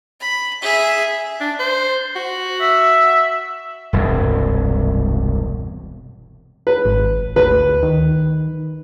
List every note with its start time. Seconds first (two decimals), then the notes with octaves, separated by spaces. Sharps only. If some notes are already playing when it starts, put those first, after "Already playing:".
0.20 B5
0.62 G#4 E5
1.41 D4
1.59 C5
2.16 F#4
2.61 E5
3.93 E1 C2 G2
6.67 B4
6.85 G#1
7.36 D2 B4
7.83 D#3